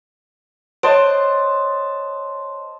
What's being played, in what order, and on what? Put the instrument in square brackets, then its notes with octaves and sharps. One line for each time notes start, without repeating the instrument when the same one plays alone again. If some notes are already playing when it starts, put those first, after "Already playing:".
[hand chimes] C5 C#5 D#5 [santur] A5 C6 D#6